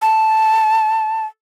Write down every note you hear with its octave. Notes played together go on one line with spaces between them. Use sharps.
A5